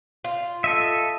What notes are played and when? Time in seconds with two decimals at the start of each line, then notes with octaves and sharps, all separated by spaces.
0.24 F4
0.64 A4 D#5 E5